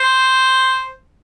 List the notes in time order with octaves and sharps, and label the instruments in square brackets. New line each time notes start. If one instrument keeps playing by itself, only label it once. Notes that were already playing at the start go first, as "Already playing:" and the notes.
Already playing: [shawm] C5